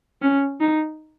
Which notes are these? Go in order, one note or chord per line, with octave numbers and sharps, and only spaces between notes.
C#4
D#4